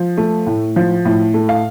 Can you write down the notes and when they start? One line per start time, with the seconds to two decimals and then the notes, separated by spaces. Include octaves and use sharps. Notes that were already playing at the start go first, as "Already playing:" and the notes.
Already playing: F3
0.18 A3
0.47 A2
0.76 F3
1.05 A2
1.34 A3
1.49 F5